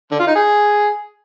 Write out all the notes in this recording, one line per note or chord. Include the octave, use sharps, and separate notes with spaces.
D3
F4
D#4
G#4